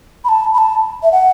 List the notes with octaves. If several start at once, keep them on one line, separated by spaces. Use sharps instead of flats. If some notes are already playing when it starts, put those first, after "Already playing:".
B5
A5
B5
A5
E5
F#5